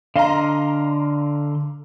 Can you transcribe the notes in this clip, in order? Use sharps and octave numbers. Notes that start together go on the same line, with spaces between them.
D3 D#5 F5 A#5 C6